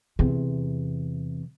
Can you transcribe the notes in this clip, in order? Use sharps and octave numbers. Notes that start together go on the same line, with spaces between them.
E2 C3